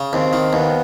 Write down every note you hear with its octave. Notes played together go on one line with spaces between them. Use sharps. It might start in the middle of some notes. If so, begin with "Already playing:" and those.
Already playing: C#3
D#2 C4
D#3
D#2 B3